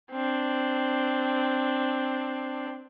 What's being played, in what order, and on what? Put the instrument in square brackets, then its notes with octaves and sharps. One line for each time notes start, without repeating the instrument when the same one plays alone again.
[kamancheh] C4 D4